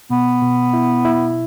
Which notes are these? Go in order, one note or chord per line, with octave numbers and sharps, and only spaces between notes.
B2 B3
B2
E4
E4